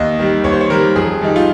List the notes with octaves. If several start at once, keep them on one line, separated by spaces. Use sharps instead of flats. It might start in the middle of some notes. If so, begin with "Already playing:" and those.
Already playing: D#2 D#5
D#3 G3
D#2 C#5
C5
C#5
D#3 G3 A#4
F2 G#4
D#3 G3 D#4
F4